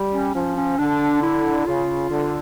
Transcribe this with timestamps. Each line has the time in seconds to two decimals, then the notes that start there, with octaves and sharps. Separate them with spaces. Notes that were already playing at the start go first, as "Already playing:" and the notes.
Already playing: G3
0.13 C#4
0.34 F3 C#4
0.56 C#4
0.78 D3 D4
1.22 E4
1.66 C#3 F4
2.10 D3